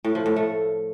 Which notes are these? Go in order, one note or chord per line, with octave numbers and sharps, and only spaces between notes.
A2
F3
A2
A3